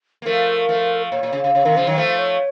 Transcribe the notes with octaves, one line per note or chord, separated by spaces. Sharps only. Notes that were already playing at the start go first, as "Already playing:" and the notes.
A#3
F3 A3 A#4
F3 A3
A#2 C#5
A#2
C#3
C#3
C#3 C#5
C3 D#3 A#4
C#3 F3 C5
D#3 F#3 C#5
F3 A3 C5
C#5